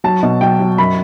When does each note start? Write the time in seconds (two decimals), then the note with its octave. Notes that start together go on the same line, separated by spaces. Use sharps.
0.04 F#3 A5
0.23 B2
0.41 F#3 G5
0.60 F#3
0.78 F#2 B5